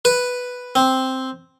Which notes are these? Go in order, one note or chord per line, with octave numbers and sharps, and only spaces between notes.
B4
C4